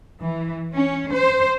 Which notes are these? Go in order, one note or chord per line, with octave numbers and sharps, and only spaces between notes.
E3
C#4
C5